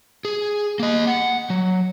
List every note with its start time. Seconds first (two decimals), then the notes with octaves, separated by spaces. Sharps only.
0.25 G#4
0.79 A#3 D#5
1.07 F#5
1.50 F#3